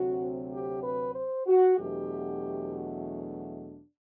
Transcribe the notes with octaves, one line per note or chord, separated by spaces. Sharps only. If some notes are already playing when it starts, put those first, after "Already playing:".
Already playing: D2 C3 F#3 C4 F#4
G4
B4
C5
F#4
E2 B2 F#3 A3 D4 G4